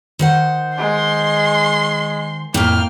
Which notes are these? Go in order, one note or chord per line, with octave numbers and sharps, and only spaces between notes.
D#3 C5 F#5
G#3 C6
F2 A2 A#3 G5 F6